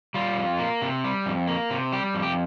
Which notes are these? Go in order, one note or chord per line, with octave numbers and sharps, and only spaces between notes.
G3 F4
F2
A#3
C3
G3
F2
A#3
C3
G3 G4
F2
G4